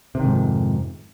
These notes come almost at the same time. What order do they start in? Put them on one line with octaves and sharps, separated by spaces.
C3 D#3 G#2 F2